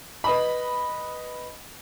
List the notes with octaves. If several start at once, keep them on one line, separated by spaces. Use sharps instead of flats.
B4 D#5 B5